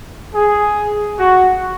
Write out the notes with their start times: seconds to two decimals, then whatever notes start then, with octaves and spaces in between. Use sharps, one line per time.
0.34 G#4
1.17 F#4